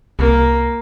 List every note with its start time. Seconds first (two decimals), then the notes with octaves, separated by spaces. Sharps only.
0.19 C2 A#3